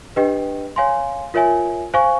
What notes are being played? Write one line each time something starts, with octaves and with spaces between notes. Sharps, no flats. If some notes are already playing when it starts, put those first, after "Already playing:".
D4 G4 B4 D#5 G5
C#5 F5 G#5 C6
F4 A#4 C#5 E5 G#5
C5 F5 G#5 C#6